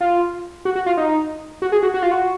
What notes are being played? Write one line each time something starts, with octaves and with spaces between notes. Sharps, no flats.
F4
F#4
F#4
F4
D#4
F#4
G#4
F#4
F#4
F4
F#4